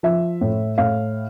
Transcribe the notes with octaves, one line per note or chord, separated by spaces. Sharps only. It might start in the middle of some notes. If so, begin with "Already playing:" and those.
F3 E5
A2
A2 F5